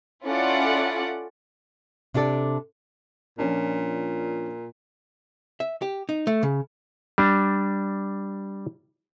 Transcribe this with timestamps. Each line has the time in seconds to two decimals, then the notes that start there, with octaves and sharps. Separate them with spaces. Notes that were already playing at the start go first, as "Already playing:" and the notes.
0.24 C#4 E4 F4 A4 D5 F#5
2.14 C3 D4 G4 A4 D5
3.38 A#2 F3 C#4 D4
5.60 E5
5.82 G4
6.09 D#4
6.27 A3
6.43 C#3
7.18 G3 D4